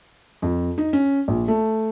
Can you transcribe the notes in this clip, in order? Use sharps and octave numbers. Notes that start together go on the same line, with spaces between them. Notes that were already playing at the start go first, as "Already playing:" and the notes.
F2
D#4
C#4
A#1
A3